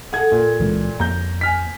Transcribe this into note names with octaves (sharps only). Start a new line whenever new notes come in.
G#4 A4 F#5 G#6
A#2
C#2 E3 G#3
F2 A#3 A#5 G6
G#5 F6 B6